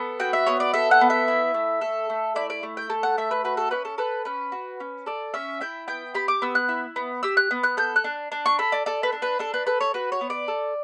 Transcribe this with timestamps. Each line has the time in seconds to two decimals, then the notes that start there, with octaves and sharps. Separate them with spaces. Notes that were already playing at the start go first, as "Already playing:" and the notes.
Already playing: B3 A4
0.20 F#4 G5
0.33 E5
0.46 B3 C#5
0.60 D5
0.74 A4 E5
0.91 F#5
1.01 B3
1.10 E5
1.28 E4
1.54 A3
1.81 A4
2.10 A3
2.35 E4 D5
2.50 D5
2.63 A3
2.77 G5
2.90 A4
3.03 F#5
3.18 A3 E5
3.31 B4
3.44 F#4 B4
3.57 A4
3.71 C#4 B4
3.85 A4
3.98 A4 B4
4.25 C#4 B4
4.52 F#4
4.80 C#4
5.06 A4 D5
5.34 C#4 E5
5.61 E4 G5
5.88 B3 G5
6.14 G4 B5
6.28 D6
6.42 B3 E6
6.55 F#6
6.69 E4
6.96 B3
7.23 G4 E6
7.37 F#6
7.51 B3
7.63 F#6
7.77 A4 G6
7.96 F#6
8.04 D4
8.32 D4
8.46 C#6
8.59 A4 B5
8.72 D5
8.86 A4 D5
9.03 B4
9.12 D4
9.22 B4
9.39 D4 A4
9.54 B4
9.67 A4 B4
9.81 C#5
9.94 F#4 B4
10.12 C#5
10.21 B3
10.30 D5
10.48 A4